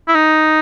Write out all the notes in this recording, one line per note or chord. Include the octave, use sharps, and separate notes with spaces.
E4
D#4